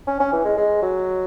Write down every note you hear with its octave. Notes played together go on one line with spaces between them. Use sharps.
C#4
C#4
E3
G#3
G#3
F#3